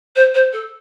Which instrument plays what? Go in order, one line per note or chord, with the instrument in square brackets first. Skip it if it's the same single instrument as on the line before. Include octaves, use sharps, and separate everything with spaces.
[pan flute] C5
C5
A4